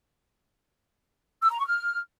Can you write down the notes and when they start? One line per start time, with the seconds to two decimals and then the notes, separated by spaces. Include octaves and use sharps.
1.42 E6
1.51 A#5
1.59 C#6
1.67 F6